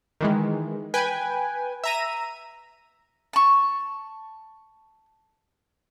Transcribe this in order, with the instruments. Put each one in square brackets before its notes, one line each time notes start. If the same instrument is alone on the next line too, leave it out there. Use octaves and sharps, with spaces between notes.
[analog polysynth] D#3 E3 G#3
B4 G5 G#5
E5 A#5 D#7
[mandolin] A5 C#6